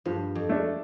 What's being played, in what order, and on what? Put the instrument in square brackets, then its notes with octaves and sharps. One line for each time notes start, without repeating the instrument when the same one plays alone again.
[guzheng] G2 [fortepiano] F3
[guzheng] F2
[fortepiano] A3 D4